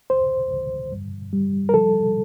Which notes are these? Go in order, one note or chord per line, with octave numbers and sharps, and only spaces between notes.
D2 C5
D2
G2
G3
A#4
F3 A4